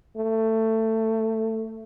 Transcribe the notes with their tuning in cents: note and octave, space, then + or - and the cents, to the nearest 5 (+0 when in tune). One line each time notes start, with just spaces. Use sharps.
A3 +15